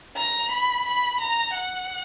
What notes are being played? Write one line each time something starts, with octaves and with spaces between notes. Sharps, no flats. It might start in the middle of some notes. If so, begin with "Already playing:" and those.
A#5
B5
B5
A#5
F#5